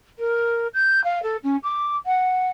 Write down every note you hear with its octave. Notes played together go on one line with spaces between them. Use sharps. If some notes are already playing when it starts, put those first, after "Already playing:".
A#4
G6
F5
A4
C#4
D6
F#5